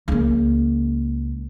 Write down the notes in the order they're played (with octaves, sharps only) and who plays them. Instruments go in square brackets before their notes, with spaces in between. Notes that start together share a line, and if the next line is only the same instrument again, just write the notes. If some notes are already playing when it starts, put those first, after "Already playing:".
[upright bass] C#2 A#3